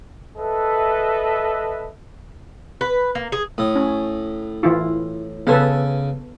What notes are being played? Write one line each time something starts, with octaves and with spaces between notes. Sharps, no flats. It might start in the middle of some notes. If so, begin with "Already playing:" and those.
A4 B4 D#5 E5
B4
A#3
G#4
A2 D#6
C#4
E3 E4 F4
C#3 B3 A4 B4 G#5